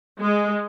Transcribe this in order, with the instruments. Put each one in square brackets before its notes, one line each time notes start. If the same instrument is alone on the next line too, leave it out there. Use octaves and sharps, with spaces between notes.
[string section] G#3